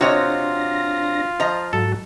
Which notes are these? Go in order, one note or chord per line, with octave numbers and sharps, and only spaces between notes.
C3 D4 F4 F#4 C#5 D#5 A#6
F3 D#5 A#5
G#2 F#3 F#4 A4